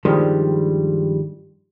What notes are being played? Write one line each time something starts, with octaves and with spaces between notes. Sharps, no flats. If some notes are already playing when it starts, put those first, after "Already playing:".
G2 D#3 F3 G3 G#3